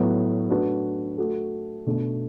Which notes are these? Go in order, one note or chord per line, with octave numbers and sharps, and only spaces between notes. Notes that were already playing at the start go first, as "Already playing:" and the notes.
Already playing: A2 F#3 B3
A3 D4 F#4 B4
A3 F#4 A4
B2 A3 D4